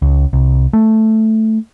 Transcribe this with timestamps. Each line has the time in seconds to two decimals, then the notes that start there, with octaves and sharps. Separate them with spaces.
0.02 C#2
0.33 C2
0.73 A3